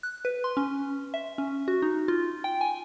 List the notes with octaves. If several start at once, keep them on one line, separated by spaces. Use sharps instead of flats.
F#6
B4
C6
C#4
E5
C#4
F#4
D#4
F4
G5
G#5